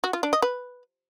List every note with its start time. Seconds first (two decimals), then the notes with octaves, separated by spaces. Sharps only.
0.04 F#4
0.13 F4
0.23 D4
0.33 D#5
0.42 B4